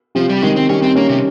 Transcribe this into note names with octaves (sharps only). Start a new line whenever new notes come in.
C3 F3
G3
D#3 G#3
C4
G3 C#4
C4
A#3 C#4
C3